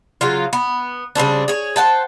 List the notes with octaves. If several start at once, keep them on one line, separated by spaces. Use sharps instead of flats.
C#3 F#3 F4
B3
C#3 G3 C4 D4
G#4 C#5
C5 F#5 G5 A5